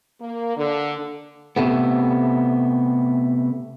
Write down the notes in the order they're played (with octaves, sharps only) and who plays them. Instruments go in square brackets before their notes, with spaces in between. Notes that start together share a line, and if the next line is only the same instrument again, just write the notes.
[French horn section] A#3
D3
[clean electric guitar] C3 A3 B3